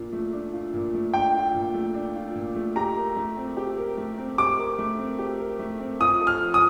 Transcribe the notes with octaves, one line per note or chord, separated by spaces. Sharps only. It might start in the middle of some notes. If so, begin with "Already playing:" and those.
Already playing: A#2 D4 F4
A3
D4
F4
A#2
A3
D4 G5
F4
A#2
A3
D4
F4
A#2
A3
G4 A#5
A#4
A3
C4
G4
A#4
A3
C4
G4 D6
A#4
A3
C4
G4
A#4
A3
C4
F4 D#6
A4
F6
F3
D#6